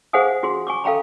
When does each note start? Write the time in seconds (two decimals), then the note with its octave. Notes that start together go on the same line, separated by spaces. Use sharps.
0.13 G#4 C5 F5 F#5 G#5 D#6
0.43 F4 F#4 G#4 C6
0.67 G#5 C#6 D6
0.84 A4 F5 G5 A#5 B5